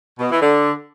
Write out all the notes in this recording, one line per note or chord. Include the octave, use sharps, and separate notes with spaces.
B2
E3
D3